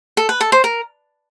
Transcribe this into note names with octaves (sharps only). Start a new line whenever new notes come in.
A4
B4
A4
C5
A#4